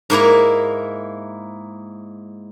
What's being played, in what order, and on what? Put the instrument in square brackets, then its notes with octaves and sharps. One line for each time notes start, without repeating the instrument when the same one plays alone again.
[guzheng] G#2 A#3 E4 A#5